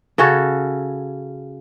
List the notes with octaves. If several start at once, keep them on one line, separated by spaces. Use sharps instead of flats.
C#3 C#4 F#4 A4